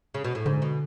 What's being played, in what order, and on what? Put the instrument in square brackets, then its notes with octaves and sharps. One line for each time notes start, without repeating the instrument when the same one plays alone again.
[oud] C#3
B2
A2
[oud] G#2 [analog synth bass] D3
[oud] B2